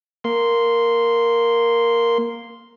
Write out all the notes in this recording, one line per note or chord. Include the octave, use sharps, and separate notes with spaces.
A#3 C6